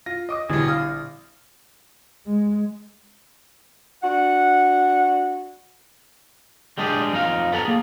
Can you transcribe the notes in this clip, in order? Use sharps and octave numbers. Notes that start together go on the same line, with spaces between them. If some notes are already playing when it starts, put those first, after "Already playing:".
F4 A#6
D#5 D6 D#6
A#1 B2 D3 G3 E4 G#4 A#6
F5 D#6
G#3
D4 F#4 F#5
G3 G#3 D4 G4 G#4
F2 D#4 F5
B3 A4 F#5 A#5
A#3 G#4